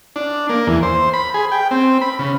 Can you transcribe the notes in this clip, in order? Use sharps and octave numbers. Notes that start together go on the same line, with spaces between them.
D4
A#3
E2
C5
B5
G#4
G5
C4
B5
C#3